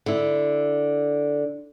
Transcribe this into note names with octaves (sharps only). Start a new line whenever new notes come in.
D3 E4